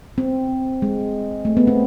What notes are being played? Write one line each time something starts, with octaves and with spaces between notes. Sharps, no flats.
C4
G#3
A3
B3
C4